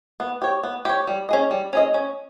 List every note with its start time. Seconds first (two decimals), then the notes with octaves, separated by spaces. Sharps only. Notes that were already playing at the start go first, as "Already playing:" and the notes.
0.20 B3
0.42 G4 C#5
0.63 B3
0.85 G4 C#5
1.07 G3
1.29 C#4 G#4 D#5
1.51 G3
1.73 C#4 G#4 D#5
1.94 C#4